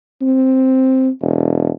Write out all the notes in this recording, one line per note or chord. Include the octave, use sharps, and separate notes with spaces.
C4
E1